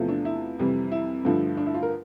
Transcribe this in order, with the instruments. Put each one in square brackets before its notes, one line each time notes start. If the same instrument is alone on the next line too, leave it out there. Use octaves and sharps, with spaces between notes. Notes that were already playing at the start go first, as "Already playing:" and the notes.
Already playing: [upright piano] E2 C3 F3 A3
D4
E4
F2 C3 E3 G3
E4
G2 D3 F3 A3
D4
E4
F4
A#4